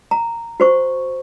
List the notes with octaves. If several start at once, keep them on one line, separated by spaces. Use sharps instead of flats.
A#5
F#4 C5 C#6